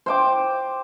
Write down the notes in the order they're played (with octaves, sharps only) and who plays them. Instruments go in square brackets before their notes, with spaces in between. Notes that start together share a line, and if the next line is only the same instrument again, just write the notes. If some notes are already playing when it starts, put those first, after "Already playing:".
[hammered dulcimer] C5 G5 D6